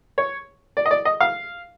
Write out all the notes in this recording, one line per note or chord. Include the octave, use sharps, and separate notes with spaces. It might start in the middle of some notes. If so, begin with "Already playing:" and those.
C#5
D5
D#5
D5
D#5
F5